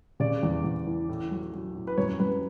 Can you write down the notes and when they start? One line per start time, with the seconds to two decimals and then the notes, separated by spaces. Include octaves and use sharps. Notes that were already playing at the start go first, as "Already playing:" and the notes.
0.20 C#3 D5
0.43 E2
0.64 E2
0.87 E3
1.09 A2
1.31 F#3
1.53 F#3
1.75 A2
1.87 B4
1.98 F#2 C#5
2.19 F#2 B4